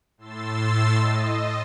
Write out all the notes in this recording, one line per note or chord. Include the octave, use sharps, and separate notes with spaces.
A2 C6 E6 A6
D#5